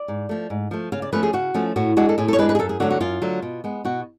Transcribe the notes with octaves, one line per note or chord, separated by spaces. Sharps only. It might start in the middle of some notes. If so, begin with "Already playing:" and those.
Already playing: D5
G#2
F3 A3
G#2
F3 A3
C#3 F5
D5
F3 A3 C#4 B4
G#4
C#3 F#4
F3 A3 C#4
A2 F#4
G#3 D4 F#4
A4
A2 G#4
A4
C#5
G#3 D4 B4
B4
G#4
F#2 A4
G#4
D3 F#3 A3 F#4
F#4
F#2 F4
D3 F#3 A3
B2
G#3 B3
B2 F#4